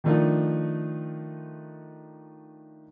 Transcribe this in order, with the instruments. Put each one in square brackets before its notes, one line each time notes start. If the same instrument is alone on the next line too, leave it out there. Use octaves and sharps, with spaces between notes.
[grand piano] D#3 F3 A3 D4 D#4 F4